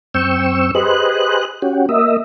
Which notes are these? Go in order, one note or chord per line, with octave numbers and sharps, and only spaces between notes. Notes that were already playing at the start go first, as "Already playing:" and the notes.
F#2 C4 G5 C#6 E6
G4 G#4 B4 C5 D#5 F#6
C#4 F#4 G4
A#3 D#5 E5